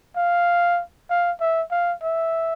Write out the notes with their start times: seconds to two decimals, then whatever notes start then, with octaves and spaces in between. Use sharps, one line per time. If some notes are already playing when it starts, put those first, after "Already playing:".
0.17 F5
1.10 F5
1.41 E5
1.72 F5
2.03 E5